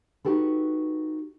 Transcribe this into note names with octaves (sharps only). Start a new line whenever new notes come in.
D#4 F#4 G4 A4 B4